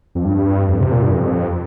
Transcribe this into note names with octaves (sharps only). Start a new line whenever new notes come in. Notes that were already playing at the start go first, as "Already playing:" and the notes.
F2
G2
F2
C3
A#2
G2
F2